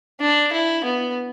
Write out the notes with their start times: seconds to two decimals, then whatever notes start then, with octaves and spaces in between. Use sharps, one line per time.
0.21 D4
0.52 E4
0.84 B3